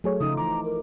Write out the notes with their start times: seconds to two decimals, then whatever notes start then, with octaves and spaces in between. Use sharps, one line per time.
0.04 F#3 A3 G#4 C#5
0.21 C#3 F3 D#4 F4 D#6
0.37 E3 A#5 D6
0.64 A#4